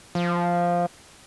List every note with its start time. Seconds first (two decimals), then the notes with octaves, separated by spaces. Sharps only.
0.15 F3